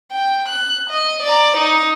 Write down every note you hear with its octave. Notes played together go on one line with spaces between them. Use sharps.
G5
F#6
D#5
D5 A#5
D#4